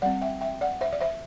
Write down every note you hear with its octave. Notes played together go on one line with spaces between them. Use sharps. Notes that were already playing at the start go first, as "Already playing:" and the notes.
G3 C4 D5 F#5
E5 G5
E5 G5
D5 F#5
C5 E5
D5
C5 E5